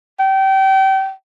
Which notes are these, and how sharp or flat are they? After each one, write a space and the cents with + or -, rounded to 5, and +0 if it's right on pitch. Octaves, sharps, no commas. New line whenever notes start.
G5 -30